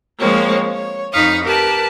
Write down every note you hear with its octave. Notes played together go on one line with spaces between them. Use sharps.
F3 G#3 A#3 C4 C#5
C#5
F2 D#4 F5 B5 C#6 D#6
G4 A#4 B4 A5 F#6